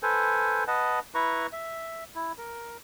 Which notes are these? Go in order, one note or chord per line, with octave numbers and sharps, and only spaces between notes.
A4 B4 C5 G#5
B4 D#5 F#5 A5
E4 B4 A#5 C#6
E5
E4
A#4